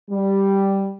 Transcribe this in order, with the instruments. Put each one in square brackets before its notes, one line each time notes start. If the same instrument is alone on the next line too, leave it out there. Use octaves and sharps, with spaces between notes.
[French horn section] G3